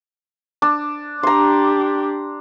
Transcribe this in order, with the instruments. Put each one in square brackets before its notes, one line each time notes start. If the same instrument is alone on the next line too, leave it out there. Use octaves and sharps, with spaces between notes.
[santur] D4
[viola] D4 G4 [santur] A#5 C6